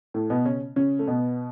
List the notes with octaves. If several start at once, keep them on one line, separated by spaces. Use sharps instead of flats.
A2 A3
B2 B3
C#3 C#4
C#3 C#4
A3
B2 B3